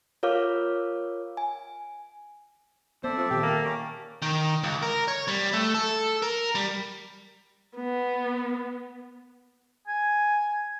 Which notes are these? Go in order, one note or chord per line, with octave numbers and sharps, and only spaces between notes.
F4 A#4 C#5 F5 D6 F6
G#5
B3 C4 A4 C5 D5 E5
F3
A#2 D#3 G4
A#3
C#4 G4 D6
D#3
C#2
A#4
C#5
G3
A3
A4
A#4
G3
B3
G#5